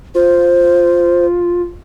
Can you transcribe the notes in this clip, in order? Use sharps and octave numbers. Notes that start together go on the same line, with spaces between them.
F4 C5